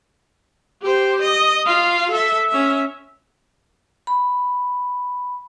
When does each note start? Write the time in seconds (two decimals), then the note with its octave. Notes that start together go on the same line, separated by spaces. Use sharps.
0.82 G4 C5
1.22 D#5
1.66 F4 F5
2.11 A4 E5
2.48 C#4 E5
4.07 B5